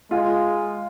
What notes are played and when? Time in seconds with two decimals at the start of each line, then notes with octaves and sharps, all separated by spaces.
0.11 G#3 F4